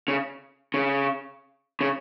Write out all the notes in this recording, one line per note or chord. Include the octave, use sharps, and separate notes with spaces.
C#3
C#3
C#3